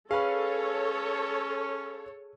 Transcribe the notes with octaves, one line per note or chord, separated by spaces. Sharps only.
C#4 G#4 A4 B4 C#5 F5